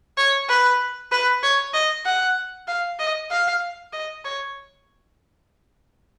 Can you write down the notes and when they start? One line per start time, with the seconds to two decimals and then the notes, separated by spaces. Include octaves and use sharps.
0.17 C#5
0.49 B4
1.12 B4
1.43 C#5
1.74 D#5
2.05 F#5
2.68 F5
2.99 D#5
3.31 F5
3.93 D#5
4.25 C#5